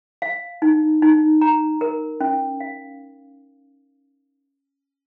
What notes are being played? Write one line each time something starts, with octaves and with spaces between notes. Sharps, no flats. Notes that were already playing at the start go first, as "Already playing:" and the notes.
F5
D#4
D#4
A#5
A#4
C#4
F5